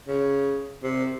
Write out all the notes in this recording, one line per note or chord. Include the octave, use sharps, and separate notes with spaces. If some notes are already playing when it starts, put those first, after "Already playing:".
C#3
C3